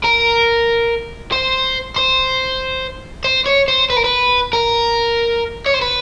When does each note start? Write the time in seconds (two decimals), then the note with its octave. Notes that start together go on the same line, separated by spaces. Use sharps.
0.04 A#4
1.32 C5
1.96 C5
3.25 C5
3.46 C#5
3.68 C5
3.90 B4
3.97 A#4
4.04 B4
4.53 A#4
5.66 C#5
5.74 C5
5.82 B4